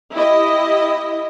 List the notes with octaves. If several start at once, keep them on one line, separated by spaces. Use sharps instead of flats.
E4 G4 D#5